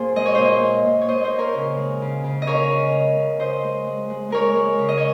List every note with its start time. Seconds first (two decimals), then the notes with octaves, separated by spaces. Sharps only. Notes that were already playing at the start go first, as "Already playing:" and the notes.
Already playing: A#2 G#4 C5
0.16 G#3 D#5
0.26 C#5
0.35 A#2 C5 D#5
0.62 G#3
0.86 A#2
1.02 C#5
1.08 A#2 C5 D#5
1.24 C5 D#5
1.31 A#2
1.39 A#4 C#5
1.55 C#3
1.77 G#3
2.02 C#3
2.24 C#3
2.42 D#5
2.47 C#3 A#4 C#5
2.71 C#3
2.93 G#3
3.17 C#3
3.40 C#3 C5 D#5
3.64 G#3
3.87 G#3
4.10 G#3
4.30 G#3 A#4 C#5
4.56 G#3
4.79 C#3
4.89 D#5
4.97 C#5